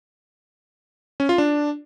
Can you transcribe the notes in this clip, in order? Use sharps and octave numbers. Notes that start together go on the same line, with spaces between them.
C#4
F4
D4